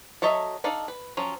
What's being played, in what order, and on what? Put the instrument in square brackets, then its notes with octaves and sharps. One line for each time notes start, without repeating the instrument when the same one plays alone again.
[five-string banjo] F#3 A4 C#5 D#5 E5
D4 D#4 A4 D5 F5
B4
F3 F#3 C#4